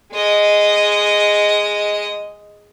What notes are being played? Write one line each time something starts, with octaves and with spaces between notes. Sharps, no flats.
G#3 D#5